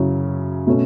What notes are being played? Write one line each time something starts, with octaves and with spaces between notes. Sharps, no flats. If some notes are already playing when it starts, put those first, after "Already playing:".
Already playing: F#2 C#3 F#3 C#4 E4
B2 A3 C#4